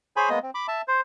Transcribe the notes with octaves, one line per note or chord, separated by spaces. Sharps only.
G#4 C5 C#5 G#5 B5
G#3 A#3 B3 D#5
C4
B5 D6
E5 A5
C5